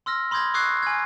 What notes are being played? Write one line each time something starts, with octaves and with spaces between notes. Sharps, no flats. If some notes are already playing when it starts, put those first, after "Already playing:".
C6 E6 F6 A#6
B5 C6 D#6 G6 G#6 A#6
C#6 D#6 E6 F#6 G#6 C7
G#5 F6 G#6